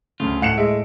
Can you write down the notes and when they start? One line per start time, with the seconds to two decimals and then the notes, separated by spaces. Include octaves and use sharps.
0.20 D2 C#3 A3 F4
0.42 A2 F#5 C#7 E7
0.58 G#3 E5 D7